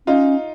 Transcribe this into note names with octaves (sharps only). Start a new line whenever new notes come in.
C#4 D#4 F4